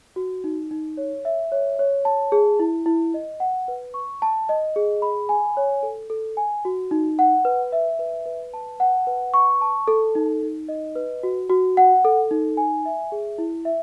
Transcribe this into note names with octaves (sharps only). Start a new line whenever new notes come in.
F#4
D#4
D#4
C#5
E5
C#5
C#5
A5
G#4
E4
E4
D#5
F#5
B4
C#6
A5
D#5
G#4
B5
G#5
C#5
A4
A4
G#5
F#4
D#4
F#5
B4
E5
B4
B4
A5
F#5
B4
C#6
A5
A4
D#4
D#4
D#5
B4
F#4
F#4
F#5
A4
D#4
G#5
E5
G#4
E4
E5